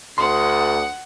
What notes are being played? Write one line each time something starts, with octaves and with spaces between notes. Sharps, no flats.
D2 F#5 C6 D#6